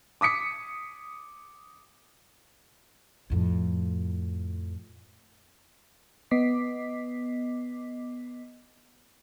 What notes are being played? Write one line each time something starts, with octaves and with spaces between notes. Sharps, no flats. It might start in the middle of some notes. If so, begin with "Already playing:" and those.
D6 D#6 B6 C#7
F2 A2
B3 D#5 D6 B6 C7